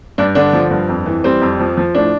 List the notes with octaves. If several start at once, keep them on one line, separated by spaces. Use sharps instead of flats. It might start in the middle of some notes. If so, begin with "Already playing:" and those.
G2 D4
D3 D4
F3
G2
F2
E3
G3 C4
F2
F3
F3
A2 D4